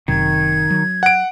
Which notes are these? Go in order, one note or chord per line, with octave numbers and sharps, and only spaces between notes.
F#1 F#2 C3 D#3 G#6
F#3
F#5 D7